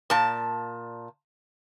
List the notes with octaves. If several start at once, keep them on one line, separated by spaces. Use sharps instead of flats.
A#2 A5